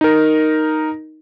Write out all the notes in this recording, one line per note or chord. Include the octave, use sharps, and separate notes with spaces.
D#4 A#4